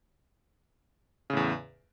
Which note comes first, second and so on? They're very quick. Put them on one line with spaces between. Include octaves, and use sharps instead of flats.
C#3 A2 E2